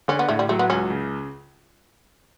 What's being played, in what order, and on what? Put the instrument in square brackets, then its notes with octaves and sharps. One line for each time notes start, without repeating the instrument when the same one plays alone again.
[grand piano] D3 [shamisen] C#4
[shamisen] B3
[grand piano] A2 [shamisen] A3
[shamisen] G3
[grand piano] F#3 [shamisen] A3
[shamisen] B3
[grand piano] C#2 [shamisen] C#4
[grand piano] C#3